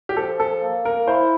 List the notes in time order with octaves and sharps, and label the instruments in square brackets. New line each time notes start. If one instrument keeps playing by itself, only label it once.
[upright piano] G4
[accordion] F3 [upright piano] A4
[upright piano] A4
[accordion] A#3
[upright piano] A#4
[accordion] E4 [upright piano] C5